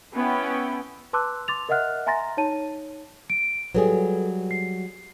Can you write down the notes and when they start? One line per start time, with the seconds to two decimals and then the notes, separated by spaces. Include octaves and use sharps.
0.14 B3 C#4 E4 G5
1.13 B4 A5 C6 D6 E6 F#6
1.48 C6 D6 A6 F7
1.69 A#4 D#5 E5 F#5 F6 F#6
2.07 E5 G#5 A#5 C6 A6 A#6
2.37 D#4 C#5 A5 D#7
3.30 D7
3.75 F#3 G3 G#4 A4 B4
4.51 C7